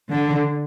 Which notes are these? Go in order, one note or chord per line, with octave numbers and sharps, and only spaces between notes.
D3